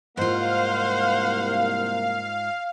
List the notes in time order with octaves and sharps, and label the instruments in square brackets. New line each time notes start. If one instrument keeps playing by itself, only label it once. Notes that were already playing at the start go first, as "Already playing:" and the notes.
[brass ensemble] C2 A#3 [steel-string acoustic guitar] G#2 F4 [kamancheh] C5 F#5 [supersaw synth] F5